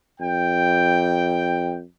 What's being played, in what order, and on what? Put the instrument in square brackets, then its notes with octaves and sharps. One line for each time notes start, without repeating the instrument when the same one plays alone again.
[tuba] F2 [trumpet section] G5